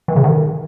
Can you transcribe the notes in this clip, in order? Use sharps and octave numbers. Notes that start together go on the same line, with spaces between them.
E3
C#3
D#3